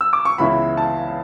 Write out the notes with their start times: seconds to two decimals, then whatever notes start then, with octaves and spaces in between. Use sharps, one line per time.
0.01 E6
0.13 D6
0.25 C#6
0.38 C#2 C#3 E3 B3 E4 B5
0.77 A5